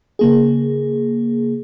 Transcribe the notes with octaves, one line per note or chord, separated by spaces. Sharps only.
C#3 A#3 G#4